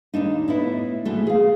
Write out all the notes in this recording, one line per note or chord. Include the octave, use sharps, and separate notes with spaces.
D#2 A2 D4 D#4
A2 B3 D4 E4
G#2 B2 E3 A3
G#4 F5